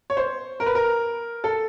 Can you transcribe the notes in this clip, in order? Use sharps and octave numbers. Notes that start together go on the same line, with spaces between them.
C#5
C5
A#4
B4
A#4
A4